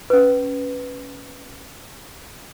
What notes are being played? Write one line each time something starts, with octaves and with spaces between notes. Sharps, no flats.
C#4 B4